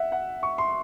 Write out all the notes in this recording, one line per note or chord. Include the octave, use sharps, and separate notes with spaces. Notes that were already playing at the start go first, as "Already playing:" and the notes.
Already playing: E5 F#5
F#5
C#6
C6